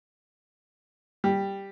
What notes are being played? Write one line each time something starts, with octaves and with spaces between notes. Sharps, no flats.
G3